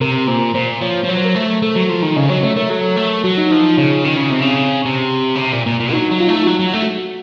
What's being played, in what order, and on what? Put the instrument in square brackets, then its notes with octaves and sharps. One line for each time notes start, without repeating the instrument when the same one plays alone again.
[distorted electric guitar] C3 [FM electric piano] A#4
[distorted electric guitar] A#2 [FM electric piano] C5
[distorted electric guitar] A#2 [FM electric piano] C5
[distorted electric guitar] F3 [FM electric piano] C#5
[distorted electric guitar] F3
[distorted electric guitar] F#3 [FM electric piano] C#5
[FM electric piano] C5
A#4
[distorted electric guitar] A3 [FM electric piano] C5
[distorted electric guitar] A3 [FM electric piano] A4
[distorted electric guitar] F#3
F3
D#3
[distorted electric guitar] C#3 [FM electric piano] D#5
[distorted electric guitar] F#3 [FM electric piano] C#5
[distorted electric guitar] A3 [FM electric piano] C#5
[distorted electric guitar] A3 [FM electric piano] A#4
[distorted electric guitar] F#3 [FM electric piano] A4
[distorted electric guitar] A3
[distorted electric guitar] F#3 [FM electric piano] F#4
[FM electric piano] D#4
[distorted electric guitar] F3 [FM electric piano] D#4
[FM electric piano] F4
[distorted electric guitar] C#3 [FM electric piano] C#4
[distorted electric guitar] D#3
C#3
[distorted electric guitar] C3 [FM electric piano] C4
[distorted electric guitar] C#3
C3
C#3
C3
A#2
A#2
A#2
[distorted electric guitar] F#3 [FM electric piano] D#4
[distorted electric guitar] F#3
[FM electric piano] F4
[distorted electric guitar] A3 [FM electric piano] D#4
[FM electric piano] F4
[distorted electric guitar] F#3 [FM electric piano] F#4
[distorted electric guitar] F#3 [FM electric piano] F#4
[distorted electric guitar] A3
[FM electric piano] F#4